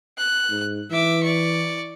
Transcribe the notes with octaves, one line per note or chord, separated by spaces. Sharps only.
F#6
G#2
E3 E5 D6
D5 C#6